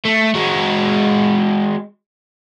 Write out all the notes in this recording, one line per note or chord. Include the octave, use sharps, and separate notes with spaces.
A3
G#3 F#4